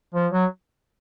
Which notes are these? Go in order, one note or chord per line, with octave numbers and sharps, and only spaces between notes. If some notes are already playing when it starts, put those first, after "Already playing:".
F3
F#3